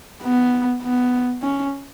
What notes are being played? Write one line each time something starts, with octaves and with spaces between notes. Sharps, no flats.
B3
B3
C#4